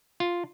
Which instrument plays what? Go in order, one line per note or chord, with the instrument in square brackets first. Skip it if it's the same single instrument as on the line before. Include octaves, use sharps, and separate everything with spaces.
[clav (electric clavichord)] F4